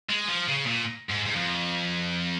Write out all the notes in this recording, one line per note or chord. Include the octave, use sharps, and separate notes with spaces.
G#3
F3
C#3
A#2
G#2
G#2
F2